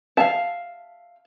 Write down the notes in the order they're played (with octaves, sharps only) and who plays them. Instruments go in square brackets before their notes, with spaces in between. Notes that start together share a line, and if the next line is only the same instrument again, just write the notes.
[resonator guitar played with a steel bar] E5 F5 [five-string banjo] A5